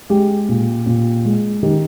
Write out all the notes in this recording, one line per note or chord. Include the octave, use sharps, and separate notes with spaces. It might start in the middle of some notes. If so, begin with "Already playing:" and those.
G#3 G4
A#2
A#2
G#3
D#3 G4